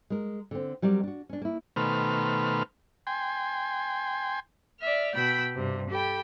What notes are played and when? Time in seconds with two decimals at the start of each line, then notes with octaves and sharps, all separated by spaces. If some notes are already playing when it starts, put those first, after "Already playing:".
0.10 G#3 A#4
0.51 D3 C4
0.82 F#3 G3 C4 A#4 D5
1.03 D4 F#4
1.29 C#4 D4
1.41 A#3 E4
1.76 B2 D#3 A3 B4 C5 F6
3.07 G5 G#5 C6
4.81 D5 E5 F6
5.14 B2 G5 B5 E6
5.56 G2 C3
5.90 G4 A4 G5 B5